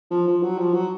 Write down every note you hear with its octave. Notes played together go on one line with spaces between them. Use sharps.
F3
F3
F#3
F3
F#3